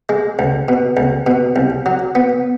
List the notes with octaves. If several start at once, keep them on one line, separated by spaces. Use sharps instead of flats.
G#3
C#2
B2
C#2
B2
C2
F#3
B3